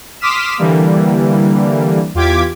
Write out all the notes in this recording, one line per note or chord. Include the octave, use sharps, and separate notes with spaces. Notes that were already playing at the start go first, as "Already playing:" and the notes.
C6 D6 D#6 F6 B6 E7
D3 E3 G3 A#3
E2 F4 G4 D6 G#6 B6